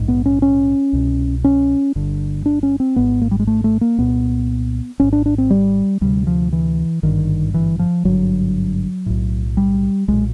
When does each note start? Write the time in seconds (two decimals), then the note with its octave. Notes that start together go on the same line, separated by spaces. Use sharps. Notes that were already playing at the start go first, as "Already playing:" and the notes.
Already playing: A#1 G#2
0.08 B3
0.26 C#4
0.42 C#4
0.93 C2 B2
1.44 C#4
1.95 G1 G2 D3
2.46 D4
2.63 C#4
2.80 C4
2.96 G#1 G#2 B3
3.21 A#3
3.31 G3
3.39 G#3
3.47 A3
3.64 A3
3.81 A#3
3.98 C2 A#2 B3
5.00 G#1 G#2 C#4
5.13 D4
5.26 D4
5.38 C4
5.50 G3
6.01 D2 C3 G3
6.27 F3
6.52 E3
7.03 G#1 G2 D3 D#3
7.54 E3
7.79 F3
8.05 G#1 G2 D3 F#3
9.06 B1 A2
9.57 G3
10.08 B1 A#2 G#3